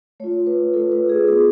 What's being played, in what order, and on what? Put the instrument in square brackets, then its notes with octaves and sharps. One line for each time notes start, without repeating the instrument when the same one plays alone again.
[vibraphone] A3 C#5
F4
B4
A3 F4 A4
B4
G#4
B3 F4 G#4